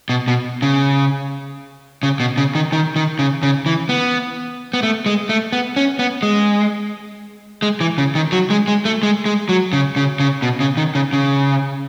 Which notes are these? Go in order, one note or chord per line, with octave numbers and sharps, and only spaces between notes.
B2
B2
C#3
C#3
B2
C#3
D#3
D#3
D#3
C#3
C#3
E3
B3
B3
A3
G#3
A3
B3
C#4
B3
G#3
G#3
E3
C#3
D#3
F#3
G#3
G#3
A3
G#3
G#3
F#3
C#3
C#3
C#3
B2
C#3
D#3
C#3
C#3